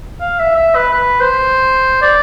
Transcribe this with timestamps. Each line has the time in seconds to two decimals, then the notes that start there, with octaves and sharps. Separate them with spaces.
0.20 F5
0.39 E5
0.57 E5
0.75 B4
0.93 B4
1.21 C5
2.02 D5